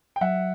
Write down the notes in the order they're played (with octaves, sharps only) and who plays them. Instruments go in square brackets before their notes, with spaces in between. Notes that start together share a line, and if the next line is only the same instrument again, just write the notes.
[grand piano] G5
[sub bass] F#3 [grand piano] E5 F#5